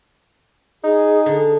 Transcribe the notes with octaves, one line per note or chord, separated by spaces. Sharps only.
D#4 G#4
D3